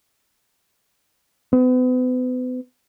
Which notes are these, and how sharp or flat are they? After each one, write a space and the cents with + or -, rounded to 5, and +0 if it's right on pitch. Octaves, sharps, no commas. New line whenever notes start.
B3 +40